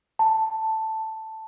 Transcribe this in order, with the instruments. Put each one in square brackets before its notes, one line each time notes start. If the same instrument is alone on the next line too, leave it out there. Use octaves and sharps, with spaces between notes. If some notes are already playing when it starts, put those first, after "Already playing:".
[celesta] A5